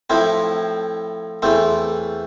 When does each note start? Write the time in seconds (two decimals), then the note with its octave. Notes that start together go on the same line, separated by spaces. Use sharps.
0.10 A2 F3 C4 E4
1.42 E2 E3 A3 C4